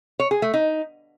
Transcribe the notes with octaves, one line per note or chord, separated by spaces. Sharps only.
C#5
G#4
A3
D#4